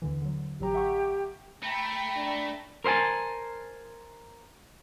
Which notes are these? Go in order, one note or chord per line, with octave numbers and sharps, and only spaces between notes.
D#2 D3 E3
D3 F#3
A1 F#3 G4 A#5
E5 F#5 C#6
A3 G5 A#5 B5
D4
A#4 C5 E5 G#5 A5